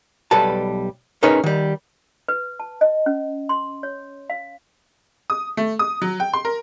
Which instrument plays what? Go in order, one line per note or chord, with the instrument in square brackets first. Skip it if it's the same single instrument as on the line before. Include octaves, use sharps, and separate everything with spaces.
[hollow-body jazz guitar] B1 G3 A4 B4 A5
C#4 D#4 G#4 A#4 B4 C#5
D#3 G3
[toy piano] B4
A5
D#5
C#4
C6
C#5
F5
[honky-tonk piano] D#6
A3
D#6
F#3
G5
C6
A#4